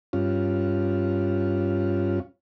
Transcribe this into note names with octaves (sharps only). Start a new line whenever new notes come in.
G2 C#4 F4